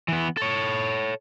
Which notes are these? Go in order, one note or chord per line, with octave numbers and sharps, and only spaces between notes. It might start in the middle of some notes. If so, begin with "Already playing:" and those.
E3 B3
A4 C#5